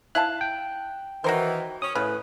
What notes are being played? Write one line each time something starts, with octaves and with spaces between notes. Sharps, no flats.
E4 F5 A5 F#6
G5
D#3 E3 F#4 A#4 C5
C#4 D#6
A2 C#3 B4